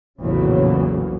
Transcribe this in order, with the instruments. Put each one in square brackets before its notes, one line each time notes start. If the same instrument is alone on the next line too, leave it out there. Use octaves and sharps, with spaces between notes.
[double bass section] A#1 E2 A2 C#3 F#3 A#3